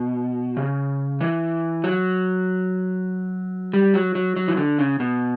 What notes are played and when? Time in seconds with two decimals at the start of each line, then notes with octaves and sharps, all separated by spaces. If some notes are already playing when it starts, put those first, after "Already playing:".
Already playing: B2
0.57 C#3
1.21 E3
1.84 F#3
3.73 G3
3.94 F#3
4.15 F#3
4.36 F#3
4.48 E3
4.57 D3
4.79 C#3
5.00 B2